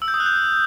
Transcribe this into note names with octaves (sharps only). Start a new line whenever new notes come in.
E6
G6
D#6
F#6
G6